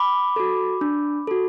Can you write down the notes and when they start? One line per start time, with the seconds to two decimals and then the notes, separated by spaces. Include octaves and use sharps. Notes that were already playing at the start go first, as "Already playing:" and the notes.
Already playing: B5 D6
0.36 F#4 A4
0.81 D4
1.27 F#4 A4